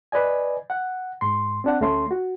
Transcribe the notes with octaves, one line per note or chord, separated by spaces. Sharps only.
B4 D5 D#5 G#5
F#5
G#2 C6
C4 D4 F#5
D2 A3 C#4 C6
F#4